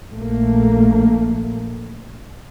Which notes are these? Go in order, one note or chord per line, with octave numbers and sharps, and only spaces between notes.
A#1 A3 A#3